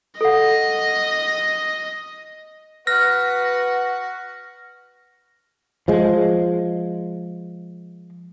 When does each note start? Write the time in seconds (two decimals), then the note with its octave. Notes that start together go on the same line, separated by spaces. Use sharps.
0.21 A4 D#5 F#5
2.87 F#4 B4 F#5 F6 A#6
5.88 F3 G#3